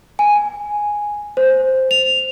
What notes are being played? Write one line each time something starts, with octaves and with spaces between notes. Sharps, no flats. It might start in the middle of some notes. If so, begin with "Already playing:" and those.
G#5
C5
F7